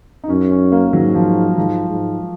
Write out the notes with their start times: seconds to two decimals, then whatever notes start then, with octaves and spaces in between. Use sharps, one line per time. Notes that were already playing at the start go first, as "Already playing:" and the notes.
0.24 D#4
0.29 F#2 C#4
0.51 C#4
0.72 A#3
0.93 G#2 F#3
1.15 F3
1.57 G#2 F3
1.89 G#2